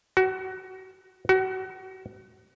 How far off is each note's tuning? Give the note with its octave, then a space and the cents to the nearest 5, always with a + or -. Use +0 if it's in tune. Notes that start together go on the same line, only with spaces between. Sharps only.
F#4 +25
F#4 +30